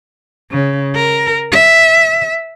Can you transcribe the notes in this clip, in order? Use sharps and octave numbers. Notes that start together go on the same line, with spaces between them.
C#3
A#4
E5